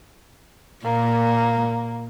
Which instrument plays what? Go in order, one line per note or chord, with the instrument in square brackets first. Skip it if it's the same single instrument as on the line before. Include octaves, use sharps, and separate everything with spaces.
[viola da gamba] A#2 [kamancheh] A#3